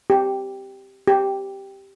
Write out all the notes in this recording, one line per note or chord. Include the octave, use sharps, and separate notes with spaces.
G4
G4